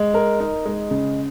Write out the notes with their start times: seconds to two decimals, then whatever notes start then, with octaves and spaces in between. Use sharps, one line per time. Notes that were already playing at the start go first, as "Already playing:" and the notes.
Already playing: G#3
0.14 A#4
0.40 D#4
0.65 G#3
0.91 C#3